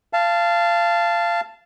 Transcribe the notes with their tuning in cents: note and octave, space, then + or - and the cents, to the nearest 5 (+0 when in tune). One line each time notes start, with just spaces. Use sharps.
F5 -20 A5 +0